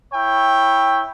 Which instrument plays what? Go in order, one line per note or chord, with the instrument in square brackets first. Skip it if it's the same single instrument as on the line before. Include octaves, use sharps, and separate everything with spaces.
[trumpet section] E4 C#5 G5